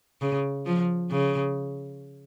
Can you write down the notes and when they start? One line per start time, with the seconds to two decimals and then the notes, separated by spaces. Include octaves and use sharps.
0.22 C#3
0.66 F3
1.11 C#3